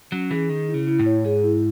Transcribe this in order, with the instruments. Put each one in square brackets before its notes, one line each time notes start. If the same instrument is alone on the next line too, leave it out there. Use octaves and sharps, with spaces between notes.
[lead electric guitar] F#3 [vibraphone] C#4
[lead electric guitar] E3 [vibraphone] G#4
[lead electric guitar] D#3 [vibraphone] G#4
[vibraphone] E4
[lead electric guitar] C#3
[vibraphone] E4
[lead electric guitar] A2
[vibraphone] C#5
[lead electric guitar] G#2 [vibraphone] G#4
[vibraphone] E4